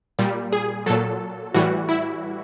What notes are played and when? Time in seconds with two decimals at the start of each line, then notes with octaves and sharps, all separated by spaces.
0.19 A#2 G3
0.53 G#4
0.86 A#2 F#3 A4
1.54 A2 E3 G3 F#4
1.89 E4